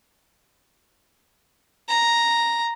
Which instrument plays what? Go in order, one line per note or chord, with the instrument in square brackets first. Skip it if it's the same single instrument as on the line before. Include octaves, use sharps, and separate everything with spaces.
[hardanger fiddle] A#5